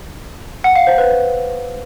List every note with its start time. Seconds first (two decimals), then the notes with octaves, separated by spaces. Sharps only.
0.64 F#5
0.76 F5
0.87 C5
0.98 B4